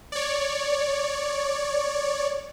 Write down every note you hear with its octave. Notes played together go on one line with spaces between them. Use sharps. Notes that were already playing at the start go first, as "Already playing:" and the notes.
C#5 D5